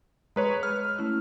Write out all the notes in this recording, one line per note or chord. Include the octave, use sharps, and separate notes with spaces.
G#3 B4 C#5 A#5
F6
A3 C#4 E4